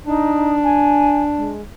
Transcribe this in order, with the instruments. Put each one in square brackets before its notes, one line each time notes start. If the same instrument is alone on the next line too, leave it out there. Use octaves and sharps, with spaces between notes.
[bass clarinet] D4 [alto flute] D#4
[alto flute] G#5
G#3